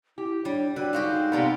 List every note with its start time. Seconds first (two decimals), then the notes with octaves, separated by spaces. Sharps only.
0.18 E4 G4
0.45 G3 D4 C#5
0.76 D3 F#4 B4 G5
0.93 G#3 D#4 F#4 G4 F5
1.32 C3 G3 B3 F4 A#4 G5